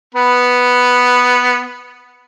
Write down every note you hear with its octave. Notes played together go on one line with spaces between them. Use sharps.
B3 B4